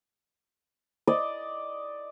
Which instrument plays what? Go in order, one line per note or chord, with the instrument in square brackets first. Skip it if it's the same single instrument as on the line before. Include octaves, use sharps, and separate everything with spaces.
[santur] D5 D#5